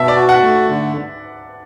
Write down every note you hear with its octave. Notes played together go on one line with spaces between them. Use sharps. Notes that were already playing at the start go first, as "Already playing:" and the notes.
Already playing: B2 E5 A5
D5
F#4
F#5
A3
D3